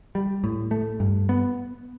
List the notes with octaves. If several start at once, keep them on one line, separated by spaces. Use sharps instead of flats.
G3
A2
A3
G2
B3